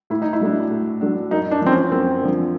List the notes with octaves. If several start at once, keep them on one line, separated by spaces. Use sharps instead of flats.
A2 E4
D#4
E4
F#3 A3 D4
A2
F#3 A3 D4
F#2 D#4
D4
D3 F3 C4
C#4
F#2 C4
D3 F3